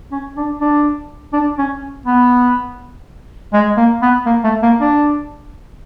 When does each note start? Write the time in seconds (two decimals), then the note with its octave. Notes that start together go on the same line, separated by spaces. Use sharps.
0.11 C#4
0.37 D4
0.61 D4
1.33 D4
1.58 C#4
2.06 B3
3.53 G#3
3.77 A#3
4.02 B3
4.26 A#3
4.44 A3
4.63 A#3
4.81 D4